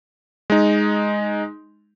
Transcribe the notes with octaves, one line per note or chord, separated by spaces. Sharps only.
G#3 D#4